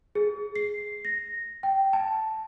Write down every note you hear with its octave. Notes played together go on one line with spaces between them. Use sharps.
G#4
C7
A#6
G5
A5